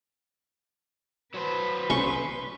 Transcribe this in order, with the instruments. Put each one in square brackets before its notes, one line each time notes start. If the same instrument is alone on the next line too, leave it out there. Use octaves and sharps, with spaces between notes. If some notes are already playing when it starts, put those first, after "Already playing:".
[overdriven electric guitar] F#3 C5 [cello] B4
[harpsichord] C#4 [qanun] C6 C#6